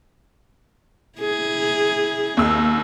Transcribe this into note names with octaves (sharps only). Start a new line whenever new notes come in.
E4 G#4
D#2 D#4 E6